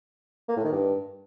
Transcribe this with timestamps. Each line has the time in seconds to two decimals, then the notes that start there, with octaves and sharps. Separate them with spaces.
0.49 A#3
0.57 A2
0.64 D#3
0.72 G2